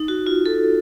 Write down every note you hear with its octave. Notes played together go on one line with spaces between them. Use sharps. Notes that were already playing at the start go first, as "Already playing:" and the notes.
Already playing: D#4
F#4
F4
A4